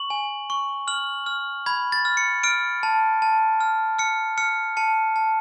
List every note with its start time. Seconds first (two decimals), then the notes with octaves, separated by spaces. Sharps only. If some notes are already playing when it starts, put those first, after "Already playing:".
Already playing: C#6 F#7
0.10 G#5
0.50 C#6
0.88 F6 F#7
1.26 F6
1.66 B5 G#6
1.92 A6
2.05 F6
2.17 C#7
2.43 F6 D7
2.83 A5
3.22 A5
3.61 F6
3.99 F6 C#7
4.38 F6 C#7
4.77 A5 C#7
5.16 A5